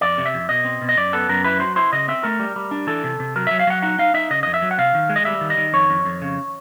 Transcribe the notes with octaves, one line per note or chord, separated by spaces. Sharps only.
F2 D5
C3
E5
F2
B2 D#5
C4
B2
D#5
F#2 D5
B3 A4
F#2 A#4
E4 B4
F#3 C5
E4 C5
C#3 D#5
C4 E5
A3 A#4
G3
G3
D4
E3 A4
C3
C3
F#3 A#4
F#3 E5
F5
F#3 F#5
D#4 F#5
D#4 F5
D#4 E5
C#3 D#5
F2 D#5
E5
F#3
F#5
C3 F5
D#3
G#3
D#5
G3 E5
D#3
D#5
D#3
F2 C#5
F2
F2
C#3